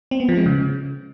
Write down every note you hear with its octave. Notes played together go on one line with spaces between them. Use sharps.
C4
B3
F3
G#3
C#3